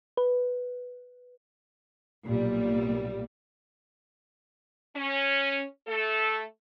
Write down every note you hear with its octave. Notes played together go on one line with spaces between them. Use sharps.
B4
B1 A#2 G3
C#4
A3 A4